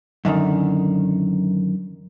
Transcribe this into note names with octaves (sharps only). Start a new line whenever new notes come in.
F#2 D3 D#3